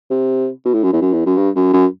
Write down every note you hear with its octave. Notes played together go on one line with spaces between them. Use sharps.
C3
B2
A2
F#2
E2
F#2
E2
F#2
G2
F#2
F#2